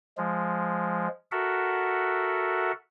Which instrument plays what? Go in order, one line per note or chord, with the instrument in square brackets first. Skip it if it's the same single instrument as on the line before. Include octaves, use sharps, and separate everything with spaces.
[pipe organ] F3 G#3
F#4 A4 A#4 E5 F#5